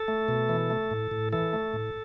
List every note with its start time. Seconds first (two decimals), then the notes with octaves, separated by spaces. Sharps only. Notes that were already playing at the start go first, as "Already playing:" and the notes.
Already playing: A4
0.08 A3
0.28 B2
0.49 E3
0.70 A3
0.91 A2
1.11 A2
1.33 E3 A4
1.53 A3
1.74 A2